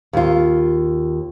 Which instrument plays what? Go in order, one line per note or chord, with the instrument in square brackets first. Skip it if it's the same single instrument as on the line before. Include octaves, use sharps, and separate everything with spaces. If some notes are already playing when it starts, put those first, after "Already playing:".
[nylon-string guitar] D#2 F4